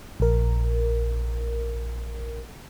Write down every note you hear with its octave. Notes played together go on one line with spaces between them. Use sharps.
A#1 A#4